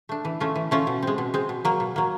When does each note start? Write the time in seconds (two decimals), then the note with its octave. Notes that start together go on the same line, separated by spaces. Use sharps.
0.09 A3 D4
0.25 E3
0.40 A3 C#4 F4
0.56 E3
0.71 A3 C#4 F4
0.87 B2
1.02 G#3 C4
1.18 B2
1.34 G#3 C4
1.49 B2
1.65 F#3 A#3
1.80 B2
1.96 F#3 A#3